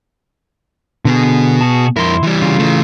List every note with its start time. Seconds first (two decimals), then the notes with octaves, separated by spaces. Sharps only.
1.05 B2 D3 B3 G#4
1.61 F#4 G#4 A5
1.97 F2 E4 A#4 C6
2.23 E3 G3
2.42 C#3 F4
2.59 E3 A3